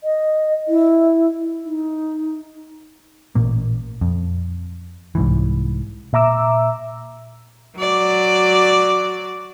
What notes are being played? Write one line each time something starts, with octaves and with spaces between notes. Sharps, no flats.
D#5
E4
D#4
A1 A#2 A#3
F2
C2 G#2 E3
A#2 E5 A#5 D6 E6
F#3 D5